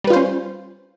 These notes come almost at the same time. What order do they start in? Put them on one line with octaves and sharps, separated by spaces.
G3 B4 F4 C5 C#4